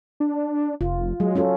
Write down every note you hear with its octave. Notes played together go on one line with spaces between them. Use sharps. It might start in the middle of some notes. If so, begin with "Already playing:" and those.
D4
F1 F4
F#3 G#3
C#4 F4 A4